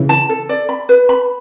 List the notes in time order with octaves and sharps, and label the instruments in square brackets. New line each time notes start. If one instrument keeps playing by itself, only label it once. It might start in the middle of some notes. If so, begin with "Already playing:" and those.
Already playing: [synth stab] C#3 E3
[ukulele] A5
A4
D5
B5
B4
B5